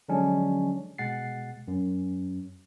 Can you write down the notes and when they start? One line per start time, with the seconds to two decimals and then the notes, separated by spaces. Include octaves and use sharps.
0.09 D3 F3 F#3 G#3 C#4 D4
0.98 B2 G#3 F#5 A6 C7
1.68 F#2